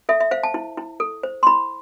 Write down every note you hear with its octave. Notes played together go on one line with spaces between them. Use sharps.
A4 E5
E5
C5 F5
A5
E4
E4
A4
C5
C6
E4 B5